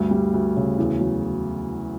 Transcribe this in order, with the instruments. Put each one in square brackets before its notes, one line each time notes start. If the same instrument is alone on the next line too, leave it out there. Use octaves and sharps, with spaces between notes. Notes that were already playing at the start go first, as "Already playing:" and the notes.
Already playing: [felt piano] D2 G2
G3
D2
C#3
E2
F#3